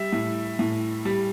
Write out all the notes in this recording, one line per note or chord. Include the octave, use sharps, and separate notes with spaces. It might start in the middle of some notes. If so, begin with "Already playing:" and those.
Already playing: G3 E5
A2
A2
G3